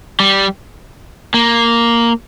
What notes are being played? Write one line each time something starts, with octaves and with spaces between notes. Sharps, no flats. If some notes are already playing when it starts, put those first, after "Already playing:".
G3
A#3